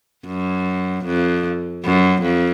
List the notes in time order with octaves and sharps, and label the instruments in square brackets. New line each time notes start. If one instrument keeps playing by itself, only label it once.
[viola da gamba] F#2
F2
F#2
F2